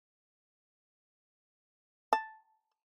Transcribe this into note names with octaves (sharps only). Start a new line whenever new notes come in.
A5